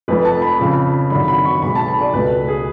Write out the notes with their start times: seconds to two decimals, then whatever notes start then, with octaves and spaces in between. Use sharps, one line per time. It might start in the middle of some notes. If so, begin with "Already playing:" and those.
0.08 F1 F2 F3 A3 B4
0.25 A5
0.42 B5
0.59 F2 C#3 F3
1.10 G#1 F#2 D3 B5
1.28 B5
1.45 C#6
1.62 B1 B2 G#3 B5
1.75 A5
1.88 B5
2.01 D5
2.14 C#2 B2 A3 B4
2.48 G#4